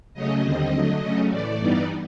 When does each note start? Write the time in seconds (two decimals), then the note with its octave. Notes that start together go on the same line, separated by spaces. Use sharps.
0.14 C#3 F#3 A3 C#4 D#5
0.43 D#2 D3 G3 C4
0.72 D3 F#3 A3
1.01 C#3 F#3 A3 C#4
1.30 A2 E3 A3 D5
1.59 G2 E3 G3 B3 D#4